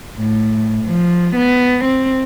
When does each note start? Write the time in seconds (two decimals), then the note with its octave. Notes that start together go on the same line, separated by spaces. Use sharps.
0.18 A2
0.85 F3
1.36 B3
1.85 C4